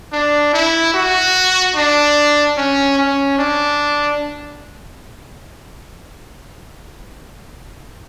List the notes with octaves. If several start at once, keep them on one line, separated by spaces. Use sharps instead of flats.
D4
E4
F#4
D4
C#4
C#4
D4